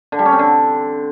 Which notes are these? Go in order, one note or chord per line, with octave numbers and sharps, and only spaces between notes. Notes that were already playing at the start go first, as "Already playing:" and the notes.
D3
G3
C#4
C4
D3